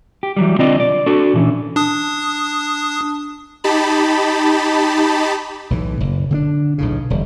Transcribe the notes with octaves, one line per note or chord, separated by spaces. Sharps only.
G4
E3 F#3 G3
B1 D3 C4 F4 D5 D#5
D5
D4 F#4 A4
A#2 E3 C#4
D4 D#6
D#4 G4 A5 B5
B1 A2 E3
F#1
D3 C4 D4
B1 A2 C#3
E1 D3 G3